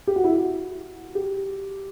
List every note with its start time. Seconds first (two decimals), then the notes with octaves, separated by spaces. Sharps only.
0.07 G4
0.16 F#4
0.24 E4
0.32 F#4
1.15 G4